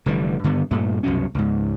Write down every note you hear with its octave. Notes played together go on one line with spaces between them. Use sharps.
F1 D3 E3 G3
G2 D3 D#3 B3
G2 A#2 A3
C2 F#2 B2 C#4
C#2 G#2